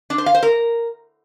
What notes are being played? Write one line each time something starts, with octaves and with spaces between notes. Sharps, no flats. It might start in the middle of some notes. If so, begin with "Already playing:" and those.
D4
C5
F5
C5
A#4